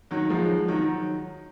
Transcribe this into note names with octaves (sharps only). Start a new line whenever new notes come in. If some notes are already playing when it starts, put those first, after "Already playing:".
D#3 F#3
F3 G#3
D#3 F#3